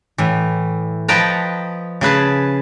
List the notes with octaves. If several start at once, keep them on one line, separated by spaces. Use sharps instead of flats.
A2 E3
F3 B4 D#5 G5 A5 A#5
C#3 G#4 B4 A5